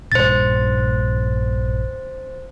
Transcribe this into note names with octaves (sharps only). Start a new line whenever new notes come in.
A#1 G2 C#4 C5 A6